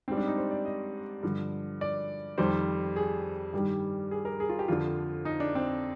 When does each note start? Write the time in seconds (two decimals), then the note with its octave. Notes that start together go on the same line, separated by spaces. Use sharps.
0.08 G#2 G3 C4
0.17 D4
0.27 D#4
0.37 C5
0.51 D5
0.65 D#5
1.23 G2 D3 F3
1.81 D5
2.38 F2 D#3 G3 C5
2.96 G#4
3.53 G2 D#3 G3 G4
4.11 G#4
4.25 A#4
4.40 G#4
4.49 F4
4.59 G4
4.68 F2 D3 F3 F4
5.25 D#4
5.40 D4
5.55 C4